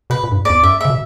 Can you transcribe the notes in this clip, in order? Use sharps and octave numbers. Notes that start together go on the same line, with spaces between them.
B2 B4
A#2
G2
F#2
E2 D5
F#2 E5
C#3 E5
B2